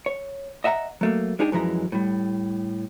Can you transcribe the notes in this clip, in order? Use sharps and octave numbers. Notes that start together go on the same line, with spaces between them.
C#5
D#5 E5 F#5 A5 A#5
F#3 A3 A#3
G#3 D4 D#4 G4 G#4
F#2 E3 F3 G#3 A#5
A2 G3